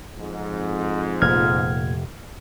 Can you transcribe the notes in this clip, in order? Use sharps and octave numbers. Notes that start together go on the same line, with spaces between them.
F2 G#2
F1 A#2 F6 G#6